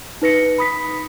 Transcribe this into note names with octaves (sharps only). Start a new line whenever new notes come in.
D#4 B4 A#6 C#7
B5 D#6 B6